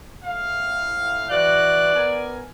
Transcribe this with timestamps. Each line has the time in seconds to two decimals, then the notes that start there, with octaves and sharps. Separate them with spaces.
0.24 A2 F5
1.30 E3 F#4 D5 F#6
1.94 B3 A#4 G#5